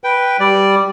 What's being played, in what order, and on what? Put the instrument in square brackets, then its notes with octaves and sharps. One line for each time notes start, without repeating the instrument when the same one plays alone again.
[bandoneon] B4 G5
G3 D5